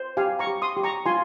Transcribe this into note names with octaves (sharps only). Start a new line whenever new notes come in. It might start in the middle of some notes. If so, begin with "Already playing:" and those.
Already playing: C5
G4 F5 G#5
A#5 C#6
G4
C6 D#6
G4
A#5 C#6
F4 G#5 C6